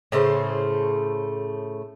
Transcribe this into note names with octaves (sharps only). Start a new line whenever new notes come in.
A2 C#3 A3 C5